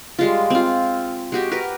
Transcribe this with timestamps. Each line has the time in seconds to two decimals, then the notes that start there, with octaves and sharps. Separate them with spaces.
0.19 G3 G#3 F4
0.50 C4 F4
1.32 G#3 F#4 G4
1.51 G4 A#4 B4